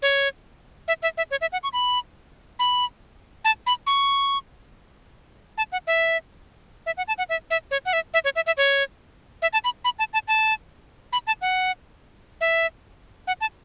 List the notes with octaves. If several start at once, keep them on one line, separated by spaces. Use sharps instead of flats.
C#5
E5
E5
E5
C#5
E5
F#5
C#6
B5
B5
A5
B5
C#6
A5
F#5
E5
E5
F#5
A5
F#5
E5
E5
C#5
F#5
E5
E5
C#5
E5
E5
C#5
E5
A5
B5
B5
A5
A5
A5
B5
A5
F#5
E5
F#5
A5